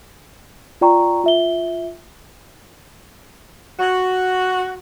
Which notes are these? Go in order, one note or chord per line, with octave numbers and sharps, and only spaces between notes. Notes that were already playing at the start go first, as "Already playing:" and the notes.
F4 D5 G5 A#5 C#6
F4 E5 G7
F#4